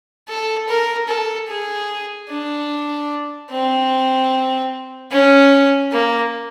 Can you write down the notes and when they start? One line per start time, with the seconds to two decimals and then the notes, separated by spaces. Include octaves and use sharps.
0.29 A4
0.68 A#4
1.08 A4
1.48 G#4
2.29 D4
3.50 C4
5.11 C#4
5.92 A#3